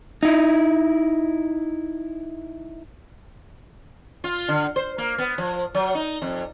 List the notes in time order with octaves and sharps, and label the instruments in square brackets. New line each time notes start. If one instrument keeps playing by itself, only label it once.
[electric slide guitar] D#4 E4
[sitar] F4
D3
C5
A#3
B3
F3
F#3
D#4
F2